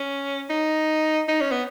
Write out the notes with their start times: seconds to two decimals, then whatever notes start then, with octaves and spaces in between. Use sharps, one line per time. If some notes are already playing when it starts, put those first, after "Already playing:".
Already playing: C#4
0.50 D#4
1.28 D#4
1.41 C#4
1.52 B3